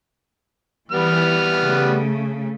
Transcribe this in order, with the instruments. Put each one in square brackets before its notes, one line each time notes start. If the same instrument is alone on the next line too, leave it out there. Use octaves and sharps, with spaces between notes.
[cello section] E3 [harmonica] G3 B3 F6
[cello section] C#3 A3